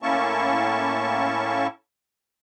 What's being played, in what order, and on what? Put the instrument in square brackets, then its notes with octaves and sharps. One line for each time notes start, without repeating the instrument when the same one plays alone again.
[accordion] A2 A#3 C#4 E4 A5 C#6